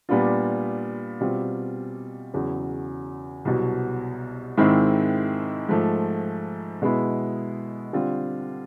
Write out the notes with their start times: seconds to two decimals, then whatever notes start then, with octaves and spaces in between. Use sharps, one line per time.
0.09 A#2 G3 B3 D4 F4
1.21 B2 G3 C4 F4
2.34 E2 C#3 F#3
3.45 C2 B2 F#3
4.57 G#2 D#3 G#3 C4 E4
5.69 G#2 F3 A3
6.82 B2 G#3 B3 E4
7.93 D3 G3 C4 F4